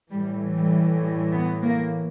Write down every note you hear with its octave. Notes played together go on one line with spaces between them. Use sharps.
A2 E3 G3
G3
G3
B3
A#3